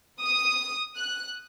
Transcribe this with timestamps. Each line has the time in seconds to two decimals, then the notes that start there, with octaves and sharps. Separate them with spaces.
0.21 D#6
0.97 F#6